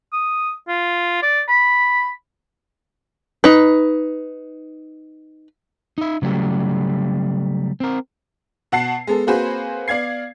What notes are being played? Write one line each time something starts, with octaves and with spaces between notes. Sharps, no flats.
D#6
F4
D5
B5
D#4 B4
D#4 E5
C#3 F#3 G3 A3
C4 A#4
B2 F#5 A5 C7
G#3 B3 A4
A#3 C4 F#4 G#4 B4 C5
B3 D5 F5 G#6 C7